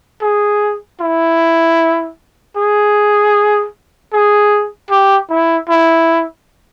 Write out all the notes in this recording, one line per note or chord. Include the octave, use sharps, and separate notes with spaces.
G#4
E4
G#4
G#4
G4
E4
E4